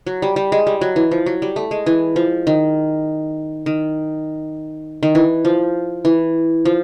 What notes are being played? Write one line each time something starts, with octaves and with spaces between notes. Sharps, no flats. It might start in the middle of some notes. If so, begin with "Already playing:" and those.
F#3
G3
G3
G#3
G3
F#3
E3
F3
F#3
G3
A3
G#3
E3
F3
D#3
D#3
D#3
E3
F3
E3
F3